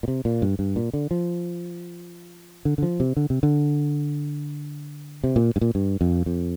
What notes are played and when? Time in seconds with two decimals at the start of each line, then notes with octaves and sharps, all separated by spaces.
0.03 A#2
0.08 C3
0.25 A#2
0.42 G2
0.59 G2
0.76 A#2
0.93 D3
1.11 F3
2.65 D3
2.78 D3
2.82 F3
3.00 C3
3.17 D3
3.30 C3
3.43 D3
5.24 C3
5.36 A#2
5.56 G2
5.61 A#2
5.75 G2
6.01 F2
6.26 F2